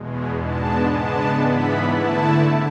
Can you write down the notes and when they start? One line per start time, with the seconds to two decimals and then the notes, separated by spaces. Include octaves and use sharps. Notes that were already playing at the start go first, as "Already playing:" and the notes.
Already playing: E2 B2 G#3
0.39 G#2 G#3 B3 D4 A5
0.91 C#3 G#3 B3 D4 A5
1.42 G#2 E3 B3 E4 B5
1.92 D3 A3 E4 A5